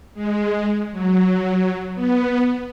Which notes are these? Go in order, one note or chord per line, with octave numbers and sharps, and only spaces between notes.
G#3
F#3
B3